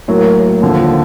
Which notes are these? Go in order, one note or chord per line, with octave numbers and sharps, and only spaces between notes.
A2 F#3 A#3
D#2 D3 F3